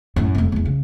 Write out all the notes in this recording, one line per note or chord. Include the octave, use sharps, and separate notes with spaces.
F#2 A2
F1 A3
E2 G#3
C#3